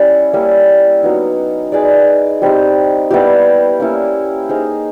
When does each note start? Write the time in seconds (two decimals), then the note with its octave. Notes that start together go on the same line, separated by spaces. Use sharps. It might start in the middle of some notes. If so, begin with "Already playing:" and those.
Already playing: G3 C#4 E4
0.33 G3 A#3 C#4 E4
1.03 F#3 B3 D#4
1.72 D#4 G#4 B4 D5
2.42 G3 C4 D#4 G4
3.11 G3 B3 E4 G4
3.80 A#3 C#4 E4
4.49 D#4 G#4 C5 F5